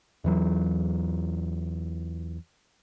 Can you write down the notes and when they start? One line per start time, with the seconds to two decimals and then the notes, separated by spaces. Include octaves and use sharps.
0.24 E2 E3 F#3